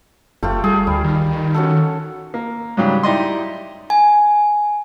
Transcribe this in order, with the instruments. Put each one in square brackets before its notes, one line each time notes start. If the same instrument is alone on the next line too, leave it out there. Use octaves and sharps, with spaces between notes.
[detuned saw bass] F#1 [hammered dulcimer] A3 F4 G4
[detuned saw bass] G3 [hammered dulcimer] G#4
[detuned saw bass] D2 [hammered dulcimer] G3
[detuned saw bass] D#3
[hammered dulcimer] C#4 F#4 A4
[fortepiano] A#3
G#2 C#3 F#3 G3
D#4 E4 G4 D5 D#5 C6
[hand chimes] G#5